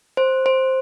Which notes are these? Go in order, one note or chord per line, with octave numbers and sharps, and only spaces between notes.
C5
C5